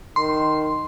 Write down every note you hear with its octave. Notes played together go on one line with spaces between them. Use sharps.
D#3 C6